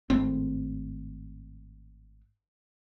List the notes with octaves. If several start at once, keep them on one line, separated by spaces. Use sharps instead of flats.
G#1 A2 C4